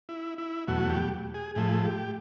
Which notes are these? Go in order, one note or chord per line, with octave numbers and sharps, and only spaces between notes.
E4
E4
E2 B2 F#3 A3 F#4
G4
G#4
A2 F3 A3 G#4
G4